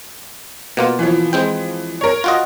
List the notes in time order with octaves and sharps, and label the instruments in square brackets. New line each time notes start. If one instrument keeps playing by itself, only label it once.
[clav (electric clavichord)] B2 A#3 F4
[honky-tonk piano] E3 F3
[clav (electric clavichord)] G#3 C4 G5
[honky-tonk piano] A#4 C#5
[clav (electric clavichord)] F4 F#4 D#5